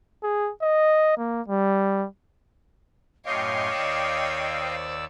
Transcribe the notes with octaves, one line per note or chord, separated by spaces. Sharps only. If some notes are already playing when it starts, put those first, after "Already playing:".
G#4
D#5
A#3
G3
F#2 A2 C#5 D#5 F5 G5 C6 D6
D#2 D5 E6
C5